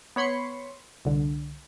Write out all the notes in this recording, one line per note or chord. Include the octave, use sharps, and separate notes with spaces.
B3 C#5 B5 C6 C#7
C2 D3